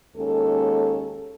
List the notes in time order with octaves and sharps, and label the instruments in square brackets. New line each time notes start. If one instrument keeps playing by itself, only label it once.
[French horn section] D#2 G#3 C#4 A4